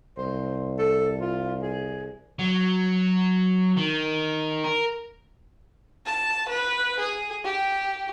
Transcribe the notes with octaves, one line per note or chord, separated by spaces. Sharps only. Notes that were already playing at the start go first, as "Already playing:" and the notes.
C2 C5
A4
F4
G#4
F#3
D#3
A#4
A5
B4
G#4
G4